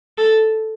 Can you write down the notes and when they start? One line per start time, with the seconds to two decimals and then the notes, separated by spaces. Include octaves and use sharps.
0.18 A4